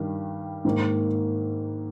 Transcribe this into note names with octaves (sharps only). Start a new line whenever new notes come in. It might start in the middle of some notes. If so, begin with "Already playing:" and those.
Already playing: G2 D#3 G3
G#2 D#3 A#3